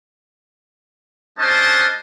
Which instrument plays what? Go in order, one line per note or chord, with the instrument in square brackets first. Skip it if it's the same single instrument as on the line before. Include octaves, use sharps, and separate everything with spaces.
[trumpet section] G3 C#4 D4 C5 D#5 A5